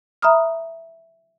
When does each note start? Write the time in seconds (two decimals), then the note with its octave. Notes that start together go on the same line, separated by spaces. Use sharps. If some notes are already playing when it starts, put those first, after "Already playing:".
0.22 E5 A#5 B5 D#6 F6